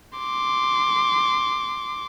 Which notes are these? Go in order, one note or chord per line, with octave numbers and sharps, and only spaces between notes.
C6 D6